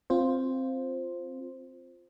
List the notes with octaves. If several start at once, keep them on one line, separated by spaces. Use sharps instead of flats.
C4 F4 C5